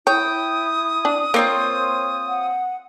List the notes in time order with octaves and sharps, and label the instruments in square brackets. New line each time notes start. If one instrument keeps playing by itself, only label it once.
[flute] E4 [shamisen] C#5 [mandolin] G5 [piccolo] D#6
[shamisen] D4
[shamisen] A#3 [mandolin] C4 D#4 F4 [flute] C#5
[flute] F#5